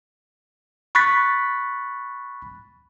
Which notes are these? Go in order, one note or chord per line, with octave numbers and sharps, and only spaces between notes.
B5 C#6 F#6 A6 B6